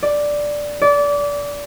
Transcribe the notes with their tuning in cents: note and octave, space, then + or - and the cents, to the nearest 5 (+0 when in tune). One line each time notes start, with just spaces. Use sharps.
D5 +0
D5 -25